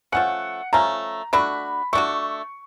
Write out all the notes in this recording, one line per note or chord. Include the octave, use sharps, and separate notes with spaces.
F3 A3 C#4 F#5
F3 A3 C#4 A#5
A3 D4 F#4 B5
A3 D4 F#4 C#6